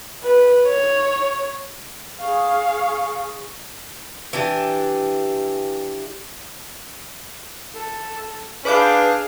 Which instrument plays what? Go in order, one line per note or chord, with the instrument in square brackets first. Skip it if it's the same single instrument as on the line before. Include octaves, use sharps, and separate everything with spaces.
[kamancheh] B4
C#5
[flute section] G#4 C#6 [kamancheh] F5
[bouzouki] E3 D4 G4
[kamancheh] A4
[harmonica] D4 [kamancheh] G#4 F5 [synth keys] B4 D6 G6